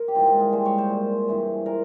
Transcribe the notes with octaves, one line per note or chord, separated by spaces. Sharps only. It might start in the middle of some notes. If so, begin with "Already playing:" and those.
Already playing: A#4 C5
G4
G#2 E3 G3 A#3 F4
F4
G#4
G#2 G3 A#3 C5
C#5
C5
A#2 G#3
G2 E3 G#3
A#2 G#3 A#4